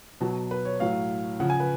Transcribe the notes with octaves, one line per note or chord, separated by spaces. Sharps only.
B2 F#3 A5
B4
C#5
A2 F#3 F5
C#3 F3 F#5
G#5
B4